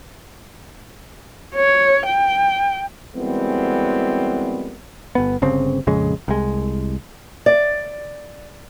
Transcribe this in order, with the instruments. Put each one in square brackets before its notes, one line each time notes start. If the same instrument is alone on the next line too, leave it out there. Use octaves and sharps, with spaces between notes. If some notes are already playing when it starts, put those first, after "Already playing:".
[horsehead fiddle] C#5
G5
[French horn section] F#2 E3 G3 G#3 B3 C4
[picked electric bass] G1 B3
G1 C#3 C4
A#1 F2 C#3 G#3
C2 G#3
[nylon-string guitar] D5